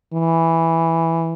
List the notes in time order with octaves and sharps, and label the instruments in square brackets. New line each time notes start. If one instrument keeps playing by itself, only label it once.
[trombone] E3